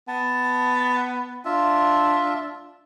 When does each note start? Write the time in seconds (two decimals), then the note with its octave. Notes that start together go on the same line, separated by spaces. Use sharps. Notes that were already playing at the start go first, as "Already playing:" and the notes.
0.08 B3 A5
1.45 D4 F4 E5